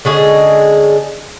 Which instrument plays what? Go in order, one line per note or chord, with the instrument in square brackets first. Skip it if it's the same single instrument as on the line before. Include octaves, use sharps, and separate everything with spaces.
[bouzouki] D3 C#4 G#4 D#5